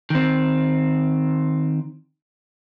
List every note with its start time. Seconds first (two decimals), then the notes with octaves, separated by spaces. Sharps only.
0.10 D#3 C4